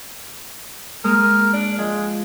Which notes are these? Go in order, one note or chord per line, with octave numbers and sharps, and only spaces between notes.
G#3 A#3 A#4 D#6
D4
F3 G#3